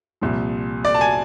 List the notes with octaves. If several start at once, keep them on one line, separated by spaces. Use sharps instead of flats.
C2 A#2 F3
D5
A5
G#5